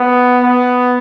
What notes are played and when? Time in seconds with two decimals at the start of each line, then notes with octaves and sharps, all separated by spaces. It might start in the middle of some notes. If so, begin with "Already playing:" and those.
Already playing: B3
0.43 B3